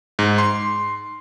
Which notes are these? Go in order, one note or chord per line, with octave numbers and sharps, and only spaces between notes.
G#2
C6